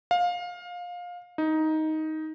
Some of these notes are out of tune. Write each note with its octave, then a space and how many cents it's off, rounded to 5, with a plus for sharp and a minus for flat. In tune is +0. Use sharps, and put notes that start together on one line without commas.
F5 +20
D#4 +10